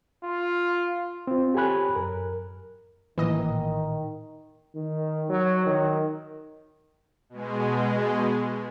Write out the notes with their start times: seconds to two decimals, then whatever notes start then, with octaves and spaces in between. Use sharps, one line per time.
0.24 F4
1.27 C4 F4
1.54 G4 A4 C#5 G#5 B5 F#6
1.96 F#2 A#4
3.18 A1 A#2 D#3 E3 D#5
4.75 D#3
5.29 F#3
5.66 D#3
7.29 B2 G#3